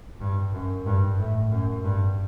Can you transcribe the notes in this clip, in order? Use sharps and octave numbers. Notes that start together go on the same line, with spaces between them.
G2
F#2
G2
A2
F#2
G2